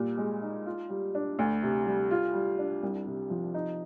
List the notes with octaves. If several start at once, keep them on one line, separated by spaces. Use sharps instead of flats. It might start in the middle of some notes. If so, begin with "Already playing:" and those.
Already playing: A#2 G3
G#3
D#4
F4
G3
D4
D2
C3
G3
F4
G3
D4
C2
C3
F3
D#4